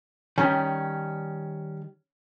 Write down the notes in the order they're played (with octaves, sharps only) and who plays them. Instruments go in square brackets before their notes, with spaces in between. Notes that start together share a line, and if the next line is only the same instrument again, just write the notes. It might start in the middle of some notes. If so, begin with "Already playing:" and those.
[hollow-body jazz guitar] D#3 G3 [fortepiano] C#4